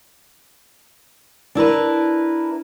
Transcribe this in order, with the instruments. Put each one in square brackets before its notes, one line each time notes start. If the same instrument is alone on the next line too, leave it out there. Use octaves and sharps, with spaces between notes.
[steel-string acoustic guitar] D4 E4 A#4 B4